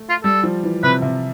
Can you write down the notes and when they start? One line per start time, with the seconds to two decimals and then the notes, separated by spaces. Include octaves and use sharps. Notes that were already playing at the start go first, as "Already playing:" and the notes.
Already playing: A3
0.09 F4
0.24 G3 A4
0.43 F3
0.64 E3
0.83 C3 B4
1.02 C3